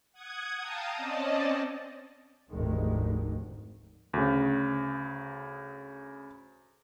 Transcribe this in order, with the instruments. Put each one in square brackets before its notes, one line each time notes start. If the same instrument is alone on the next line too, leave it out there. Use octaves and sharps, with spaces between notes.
[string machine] F#5 D#6 G#6
F5 G5 A5 A#5 D#6
C4 C#4 D5 D#5 A5
[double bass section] F1 D2 G#2 D#3 G#3
[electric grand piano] D2 C#3